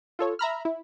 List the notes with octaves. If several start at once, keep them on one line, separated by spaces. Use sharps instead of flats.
F4 A4 C#5
E5 A#5 B5 F6
E4